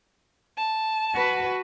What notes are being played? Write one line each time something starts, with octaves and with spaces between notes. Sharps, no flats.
A5
F#4 B4